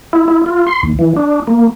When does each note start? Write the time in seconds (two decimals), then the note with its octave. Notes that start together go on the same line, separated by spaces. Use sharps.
0.13 E4
0.28 E4
0.46 F4
0.67 C6
0.83 D#2
0.99 E3
1.16 D4
1.47 A#3